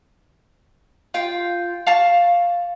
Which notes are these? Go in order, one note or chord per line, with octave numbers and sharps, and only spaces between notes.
F4 G5
F5 A5 C#6